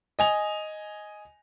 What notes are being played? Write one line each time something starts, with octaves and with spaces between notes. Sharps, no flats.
D#5 G#5 F7